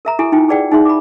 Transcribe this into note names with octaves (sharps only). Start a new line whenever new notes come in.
A#4 E5 A#5
E4 F#4 G4 A4 G#5
D#4 F4 G5
G#4 B4 D5 F#5 G5
D#4 G#4 E5 C6
B5 D6